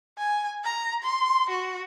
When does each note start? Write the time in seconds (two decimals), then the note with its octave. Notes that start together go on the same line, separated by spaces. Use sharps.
0.18 G#5
0.64 A#5
1.03 C6
1.49 F#4